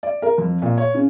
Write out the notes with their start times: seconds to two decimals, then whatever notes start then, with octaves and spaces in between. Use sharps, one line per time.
0.03 D5
0.22 A#4
0.38 F2
0.62 A#2
0.77 C#5
0.94 C#3